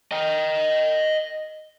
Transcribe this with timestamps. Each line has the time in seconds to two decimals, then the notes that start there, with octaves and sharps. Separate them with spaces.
0.12 D#5 G5